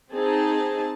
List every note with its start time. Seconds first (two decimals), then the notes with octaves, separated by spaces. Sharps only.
0.11 C4 D#4 G#4 A5